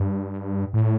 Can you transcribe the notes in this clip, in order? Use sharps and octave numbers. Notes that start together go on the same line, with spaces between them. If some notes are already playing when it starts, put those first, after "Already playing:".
Already playing: G2
A2